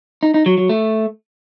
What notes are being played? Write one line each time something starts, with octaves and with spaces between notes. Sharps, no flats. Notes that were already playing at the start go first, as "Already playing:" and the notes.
D#4
D#4
F#3
F#3
A3